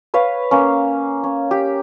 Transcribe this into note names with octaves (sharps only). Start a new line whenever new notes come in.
B4 C#5 F5
A#3 C#4
C#4
G4